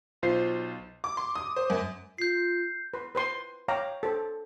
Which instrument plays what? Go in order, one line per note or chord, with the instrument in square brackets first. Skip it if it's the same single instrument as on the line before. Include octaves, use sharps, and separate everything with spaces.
[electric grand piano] B1 F4 C5 C7
[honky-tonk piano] D6
C6
D#6
C5
F#2
[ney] F4 [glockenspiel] G6 C7
[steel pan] B4 C6
B4 C5 C6
C#5 F5 G5 A#5 D6
A4 C5